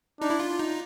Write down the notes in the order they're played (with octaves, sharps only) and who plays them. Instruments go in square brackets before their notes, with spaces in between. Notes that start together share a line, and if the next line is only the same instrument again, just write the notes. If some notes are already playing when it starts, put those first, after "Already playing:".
[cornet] D4 [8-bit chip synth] D#4
[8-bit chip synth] E4
F4
D#4